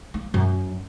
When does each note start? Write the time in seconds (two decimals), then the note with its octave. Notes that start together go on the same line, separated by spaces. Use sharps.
0.14 A#3
0.34 F#2